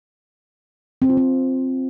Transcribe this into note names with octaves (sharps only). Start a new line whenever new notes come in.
C4
F4
C4